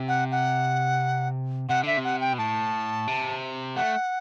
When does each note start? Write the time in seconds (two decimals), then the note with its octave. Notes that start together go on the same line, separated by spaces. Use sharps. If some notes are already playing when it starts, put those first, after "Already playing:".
Already playing: C3
0.08 F#5
0.31 F#5
1.69 C3 F#5
1.83 D3 E5
1.97 C3
2.04 F#5
2.21 G5
2.33 B2
2.38 A2 A5
3.07 C3
3.76 A3 F#5